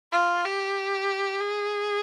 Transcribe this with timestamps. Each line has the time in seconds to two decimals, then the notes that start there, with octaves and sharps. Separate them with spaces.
0.12 F4
0.45 G4
1.41 G#4